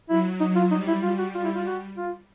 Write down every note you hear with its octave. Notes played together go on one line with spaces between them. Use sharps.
F#3 E4
D#4
F4
G3 D#4
E4
G3 F4
F#4
G3 F4
E4
F4
F#4
F4